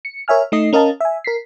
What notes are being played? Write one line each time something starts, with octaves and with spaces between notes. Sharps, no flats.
C#7
A#4 C#5 E5 G#5 F6
A3 D#4 D#5 C7
C#4 A#4 D#5 F5 A5
E5 G#5
A#4 B6 C7